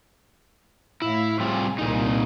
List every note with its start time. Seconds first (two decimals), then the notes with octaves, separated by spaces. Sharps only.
1.02 A2 E4 F5
1.40 G3 C4 F4 G#4
1.78 C2 A#2 D#4